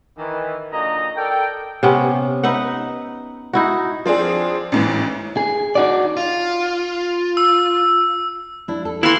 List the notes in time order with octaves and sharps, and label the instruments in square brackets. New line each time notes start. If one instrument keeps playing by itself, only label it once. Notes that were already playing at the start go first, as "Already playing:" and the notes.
[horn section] D#3 E3
A#2 D3 F#3 D#4 D#5 A#5
A4 A#4 D5 G5
[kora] C3 B3 C#4
D#4 B4 E5 F#5
D#4 E4 F#4
[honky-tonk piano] F3 C4 D4 G#4
A1 G#2 E3
[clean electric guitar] G#4
D#4 F#4 D5
[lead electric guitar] F4
[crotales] E6
[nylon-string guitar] D4 E4
A4
[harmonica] E3 [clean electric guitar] E4 [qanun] F5 C6